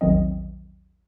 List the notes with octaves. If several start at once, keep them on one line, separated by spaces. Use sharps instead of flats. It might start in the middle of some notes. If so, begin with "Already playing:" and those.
A#1 E2 D#3 F#3 C4 D#5